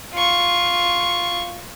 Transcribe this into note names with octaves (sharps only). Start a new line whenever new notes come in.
F4 C#6